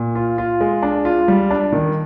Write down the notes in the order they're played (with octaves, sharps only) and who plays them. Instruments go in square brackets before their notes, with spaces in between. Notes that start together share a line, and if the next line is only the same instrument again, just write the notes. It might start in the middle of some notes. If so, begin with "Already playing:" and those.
Already playing: [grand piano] A#2
F4
F4
G#3
D4
F4
G3
D4
D#3